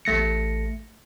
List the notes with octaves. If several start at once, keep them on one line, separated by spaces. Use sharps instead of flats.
A1 A3 A#6 C#7